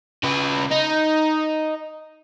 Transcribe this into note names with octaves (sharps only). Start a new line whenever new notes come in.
C#3 B4
D#4